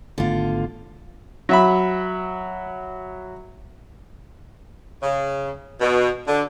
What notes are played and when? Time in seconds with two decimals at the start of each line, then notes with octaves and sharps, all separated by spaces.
0.18 G#1 D3 A3 B3 F4
1.49 F#3 E5 B5
5.03 C#3
5.81 B2
6.28 D3